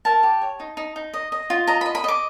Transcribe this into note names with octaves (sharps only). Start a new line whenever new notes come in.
A#4 A5
G4
C#5
D#4
D#4
D#4
D#5
D#5
F4
D#5 A#5
B5
D#5
B5
D#5 D6